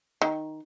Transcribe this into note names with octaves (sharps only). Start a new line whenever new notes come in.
D#3